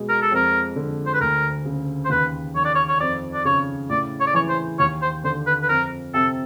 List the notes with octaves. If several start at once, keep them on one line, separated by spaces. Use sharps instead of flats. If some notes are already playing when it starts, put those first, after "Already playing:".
Already playing: B2 G#3
A#4
A4
F2 A#4
D3
C5
B4
D2 A#4
C#3
C5
D#2 B4
D#3 C#5
D5
C#5
C#5
F2 D5
D5
C#3 C#5
A2 D5
C#5
D5
E3 C#5
C5
D#2 C#5
C5
D3 C5
B4
B4
F2 A#4
C3 A4